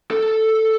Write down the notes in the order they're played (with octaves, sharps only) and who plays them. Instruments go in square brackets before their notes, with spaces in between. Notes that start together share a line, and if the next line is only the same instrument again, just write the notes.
[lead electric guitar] A4